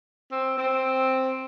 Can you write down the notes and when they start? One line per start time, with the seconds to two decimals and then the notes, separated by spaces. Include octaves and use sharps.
0.31 C4
0.58 C4